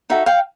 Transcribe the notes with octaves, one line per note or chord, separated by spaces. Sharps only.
D#4 F#4 A4 E5
F5 G5